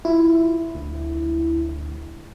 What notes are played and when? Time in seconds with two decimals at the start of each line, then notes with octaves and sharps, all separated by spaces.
0.05 E4 F4
0.74 D2